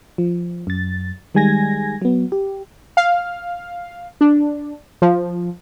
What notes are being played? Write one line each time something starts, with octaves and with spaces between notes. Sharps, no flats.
F3
F#2 A6
D#3 G3 G#3 G#5 G#6 A#6
F#3 B3
G4
F5
D4
F3